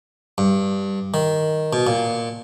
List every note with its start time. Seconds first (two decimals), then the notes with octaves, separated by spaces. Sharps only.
0.38 G2
1.14 D#3
1.73 B2
1.87 A#2